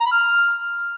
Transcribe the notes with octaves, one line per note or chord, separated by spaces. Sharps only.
A#5
B5
F6